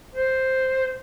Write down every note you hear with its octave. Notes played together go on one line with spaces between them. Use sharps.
C5